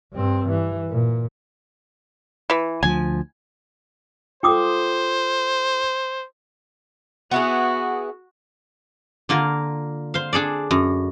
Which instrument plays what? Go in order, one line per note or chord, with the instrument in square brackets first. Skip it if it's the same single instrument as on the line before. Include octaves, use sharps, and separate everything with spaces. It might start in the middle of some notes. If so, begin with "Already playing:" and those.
[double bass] G2 C4
E3
A#2
[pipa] E3 B4
[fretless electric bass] D2 F3 [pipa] G#5
[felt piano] F4 A4 [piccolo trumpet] C5 [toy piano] G5 D6 D#6
[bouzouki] B3 E4 G#4 [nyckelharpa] F#4
[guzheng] D3 A#3 F4 A#4
C5 F5
D4 G#4 A4 D5
F#2